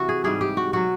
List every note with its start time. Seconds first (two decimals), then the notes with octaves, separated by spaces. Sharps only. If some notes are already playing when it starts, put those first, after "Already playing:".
Already playing: C3 E3 F#4
0.09 G#4
0.24 G#2 E3 G3 G#4
0.41 G4
0.57 F#4
0.73 B2 F#3 F#4